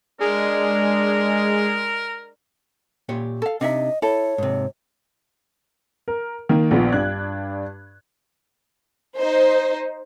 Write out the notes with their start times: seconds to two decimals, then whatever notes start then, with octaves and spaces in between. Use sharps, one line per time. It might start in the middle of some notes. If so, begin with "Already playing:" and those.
0.20 G#3 D4 A#4
3.09 A#2 G4 C#5
3.42 A4 F5
3.61 C3 D4 D#4 D#5 E5
4.02 E4 A4 C#5
4.38 G#2 C3
6.08 A#4
6.49 D#3 A#3
6.71 A#1 B3 F4
6.92 G2 D4 F#6 G#6
9.17 D#4 C5